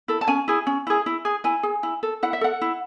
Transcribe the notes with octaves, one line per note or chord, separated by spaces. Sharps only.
E4 A4
A5
C#4 G#5
E4 G#4
C#4
E4 G#4
E4
G#4
E4 G#5
G#4
E4
A4
E4 F#5
E5
A4 F#5
E4